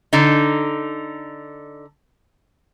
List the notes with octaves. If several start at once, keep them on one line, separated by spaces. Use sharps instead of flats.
D3 D#4